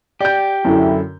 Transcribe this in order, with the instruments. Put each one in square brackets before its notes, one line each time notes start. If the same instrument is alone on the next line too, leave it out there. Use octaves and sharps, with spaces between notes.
[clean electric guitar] G4 [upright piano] D5 G6
[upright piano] F#2 D3 [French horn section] E4